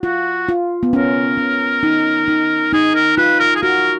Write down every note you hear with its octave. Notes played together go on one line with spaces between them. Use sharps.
F4 F#4
F4
B3
C#4 A#4
C#4
D#4
D#4
D#4 G#4
A#4
F4 B4
A#4
G#4
F#4 A#4